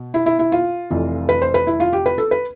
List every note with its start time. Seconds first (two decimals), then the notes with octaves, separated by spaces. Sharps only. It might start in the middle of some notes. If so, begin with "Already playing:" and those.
Already playing: B2
0.14 E4
0.26 E4
0.39 E4
0.52 F4
0.90 F1 F2 E3
1.29 B4
1.42 C5
1.54 B4
1.67 E4
1.80 F4
1.93 G4
2.06 B4
2.18 A4
2.31 B4